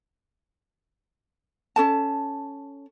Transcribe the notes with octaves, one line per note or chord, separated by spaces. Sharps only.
C#4 A4 A5